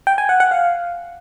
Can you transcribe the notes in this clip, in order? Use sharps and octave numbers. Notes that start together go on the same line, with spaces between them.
G5
G#5
F#5
F#5
F5